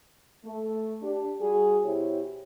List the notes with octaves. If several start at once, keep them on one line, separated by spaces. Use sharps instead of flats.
A3
D4 G4
G3 F#4 G#4
B2 E4 G4 C5 C#5